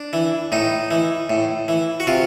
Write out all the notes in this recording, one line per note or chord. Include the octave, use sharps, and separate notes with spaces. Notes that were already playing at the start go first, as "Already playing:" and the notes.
Already playing: D4
E3
A2 D#4
E3
A2
E3
F#4
C3 F4